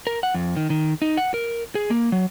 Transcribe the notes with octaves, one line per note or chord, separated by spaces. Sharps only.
A#4
F#5
F2
D#3
D#3
D#4
F#5
A#4
G#4
A#3
F#3